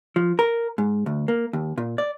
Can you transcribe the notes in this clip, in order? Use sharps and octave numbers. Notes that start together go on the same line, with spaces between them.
F3
A#4
G#2
D2
A#3
D#2
A#2
D5